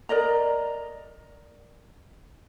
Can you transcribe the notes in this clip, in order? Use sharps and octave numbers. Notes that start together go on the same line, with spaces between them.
A#4 D5 D#5 A#5